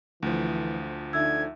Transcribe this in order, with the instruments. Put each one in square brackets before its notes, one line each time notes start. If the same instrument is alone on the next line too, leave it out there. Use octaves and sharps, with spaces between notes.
[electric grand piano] D2 F3 [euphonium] E3
[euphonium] D3 [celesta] D#4 E5 E6 [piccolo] G#6